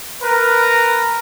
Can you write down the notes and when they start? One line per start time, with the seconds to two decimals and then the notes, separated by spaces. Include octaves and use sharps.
0.21 A#4 B4 A#5